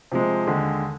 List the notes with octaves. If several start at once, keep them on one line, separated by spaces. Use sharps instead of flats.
C3 F3 G#3
D#2 D3 G#3